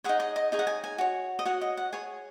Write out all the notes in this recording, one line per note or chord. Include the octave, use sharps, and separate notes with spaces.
D#4 G#4 C#5 F#5
D#5
D#5
D#4 G#4 C#5
F#5
G#5
G#5
F#4 C#5
D#5
F#4 C#5 F#5
D#5
F#5
G#4 C#5 G#5